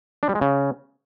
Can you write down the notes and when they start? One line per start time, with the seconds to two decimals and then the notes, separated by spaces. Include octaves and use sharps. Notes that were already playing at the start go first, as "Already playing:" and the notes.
0.23 D4
0.29 G3
0.35 G#3
0.41 C#3